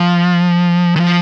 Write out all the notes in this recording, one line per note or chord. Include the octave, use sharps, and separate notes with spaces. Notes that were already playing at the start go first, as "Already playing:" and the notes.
Already playing: F3
D#3
F3